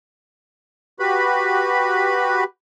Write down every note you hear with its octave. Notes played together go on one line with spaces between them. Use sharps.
F#4 G4 B4 B5